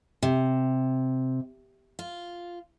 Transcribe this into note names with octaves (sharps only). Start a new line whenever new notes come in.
C3
F4